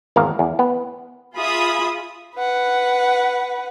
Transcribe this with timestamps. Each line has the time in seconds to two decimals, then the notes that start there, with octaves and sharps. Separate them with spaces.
0.16 G#1 E2 A#4 F5
0.39 E2
0.59 B3
1.36 F4 G#4 E5 B5 D#6
2.36 B4 F#5